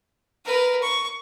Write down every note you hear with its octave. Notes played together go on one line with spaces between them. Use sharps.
A#4 B4
C#6